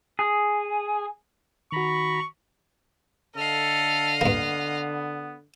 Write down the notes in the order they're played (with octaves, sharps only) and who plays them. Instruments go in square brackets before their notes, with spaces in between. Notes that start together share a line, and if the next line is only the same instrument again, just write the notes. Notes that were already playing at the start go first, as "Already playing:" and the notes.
[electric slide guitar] G#4
[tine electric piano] D#3 F#4 [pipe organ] A#5 B5 [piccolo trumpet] C#6
[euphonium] D3 [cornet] A4 [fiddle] D#5 F5
[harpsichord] G2 A#3 [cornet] B3